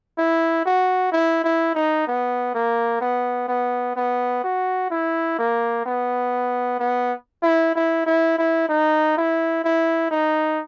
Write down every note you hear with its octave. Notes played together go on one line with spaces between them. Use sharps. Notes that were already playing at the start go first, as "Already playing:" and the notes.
E4
F#4
E4
E4
D#4
B3
A#3
B3
B3
B3
F#4
E4
A#3
B3
B3
E4
E4
E4
E4
D#4
E4
E4
D#4